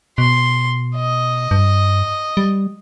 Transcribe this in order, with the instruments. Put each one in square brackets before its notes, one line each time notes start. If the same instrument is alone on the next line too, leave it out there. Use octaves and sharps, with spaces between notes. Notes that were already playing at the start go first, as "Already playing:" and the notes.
[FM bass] B2 [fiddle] C6
[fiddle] D#5
[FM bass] G2
G3